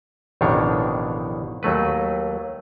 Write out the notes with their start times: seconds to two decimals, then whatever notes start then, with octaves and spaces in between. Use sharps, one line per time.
0.41 A1 F2 B2 D#3 D4 C#5
1.63 D#2 F#3 A3 B4